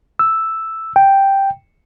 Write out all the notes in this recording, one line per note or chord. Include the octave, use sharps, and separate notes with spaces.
E6
G5